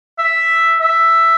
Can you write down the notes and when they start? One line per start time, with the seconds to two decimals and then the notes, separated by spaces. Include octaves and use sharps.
0.19 E5
0.80 E5